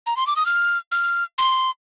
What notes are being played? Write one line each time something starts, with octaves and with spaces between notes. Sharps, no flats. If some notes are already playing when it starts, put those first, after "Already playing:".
A#5
C6
D6
D#6
F6
F6
C6